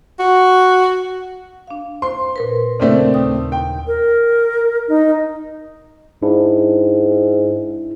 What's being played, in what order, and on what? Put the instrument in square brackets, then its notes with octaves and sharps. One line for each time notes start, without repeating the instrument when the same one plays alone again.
[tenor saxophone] F#4
[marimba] D4 F5
[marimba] C5 [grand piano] C6
[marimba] A#2 A#4 B4
[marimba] C#3 A#4 [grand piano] A3 C4 D4
[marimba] D#2 D#6
[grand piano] G5
[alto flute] A#4
D#4
[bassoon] G#2 [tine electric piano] D4 E4